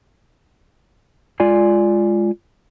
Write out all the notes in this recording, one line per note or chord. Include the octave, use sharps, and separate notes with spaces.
G#3 F4 D5 G#5